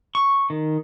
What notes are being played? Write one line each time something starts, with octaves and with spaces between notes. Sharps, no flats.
C#6
D#3